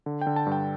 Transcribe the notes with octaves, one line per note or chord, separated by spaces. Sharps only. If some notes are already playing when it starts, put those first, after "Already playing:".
D3
G5
D3
A5
G2
G5